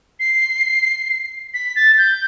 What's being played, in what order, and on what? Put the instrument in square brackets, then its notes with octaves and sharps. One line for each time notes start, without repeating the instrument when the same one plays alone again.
[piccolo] C7
B6
A6
G6